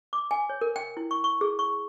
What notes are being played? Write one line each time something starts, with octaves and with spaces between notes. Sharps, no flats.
D6
G#5
C#5
A#4
G5
E4
C#6
C#6
G#4
C#6